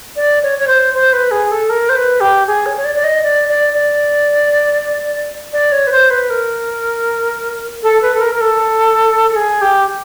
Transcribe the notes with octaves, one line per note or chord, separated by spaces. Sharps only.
D5
C#5
C#5
C5
C5
B4
G#4
A4
A#4
C5
B4
G4
G#4
C#5
C#5
D5
D5
D#5
D5
D5
D5
D5
C#5
B4
C5
B4
A#4
A4
B4
A4
A#4
A#4
A4
A4
G#4
G4